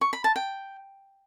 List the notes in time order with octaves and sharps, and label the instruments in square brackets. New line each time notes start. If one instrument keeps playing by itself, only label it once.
[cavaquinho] C#6
B5
A5
G5